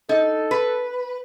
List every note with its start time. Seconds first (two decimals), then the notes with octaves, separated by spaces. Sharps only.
0.09 D#4 A4
0.51 B4